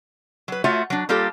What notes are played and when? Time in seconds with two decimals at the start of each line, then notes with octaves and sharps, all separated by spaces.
0.48 F#3 B4
0.64 A3 F4 F#4 C#5 E5
0.90 F#3 D4
1.09 G3 A#3 F4 G4 A4